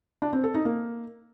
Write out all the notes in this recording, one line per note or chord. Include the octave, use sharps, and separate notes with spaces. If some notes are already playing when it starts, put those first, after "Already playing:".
D4
C4
A4
D#4
A#3